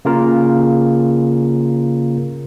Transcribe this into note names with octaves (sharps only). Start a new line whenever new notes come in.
C#3 A#3 F4 A#4